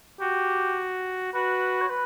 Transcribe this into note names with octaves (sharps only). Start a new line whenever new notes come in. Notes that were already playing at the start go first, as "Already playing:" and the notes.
F#4 G4
F#4 B4
C#5
B4